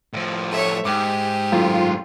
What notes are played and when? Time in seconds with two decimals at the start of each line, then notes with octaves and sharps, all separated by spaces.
0.14 A2 F3
0.52 A3 C#5 E5
0.85 G#2 G4 D6
1.52 G#1 F#2 A2 F4